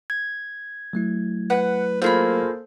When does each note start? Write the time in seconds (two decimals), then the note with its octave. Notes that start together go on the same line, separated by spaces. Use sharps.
0.10 G#6
0.93 F#3 A3 E4
1.50 B4 F#5
2.02 A#3 F4 G#4 A4 C5 B5